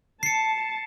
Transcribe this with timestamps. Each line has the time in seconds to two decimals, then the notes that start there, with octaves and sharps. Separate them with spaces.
0.23 A5 C7 C#7